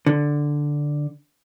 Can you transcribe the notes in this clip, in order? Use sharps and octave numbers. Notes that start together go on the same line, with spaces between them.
D3